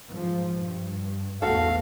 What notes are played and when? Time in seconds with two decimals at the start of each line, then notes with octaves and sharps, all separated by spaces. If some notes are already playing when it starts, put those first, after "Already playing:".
0.11 G#2 F3
0.54 G2
1.42 A1 E2 A3 F#4 A4 F5